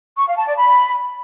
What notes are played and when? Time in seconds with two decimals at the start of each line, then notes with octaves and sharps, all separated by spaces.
0.17 C#6
0.27 F5
0.37 A5
0.47 D5
0.57 B5